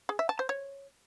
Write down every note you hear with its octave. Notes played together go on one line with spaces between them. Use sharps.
G#4
E5
A5
C5
C#5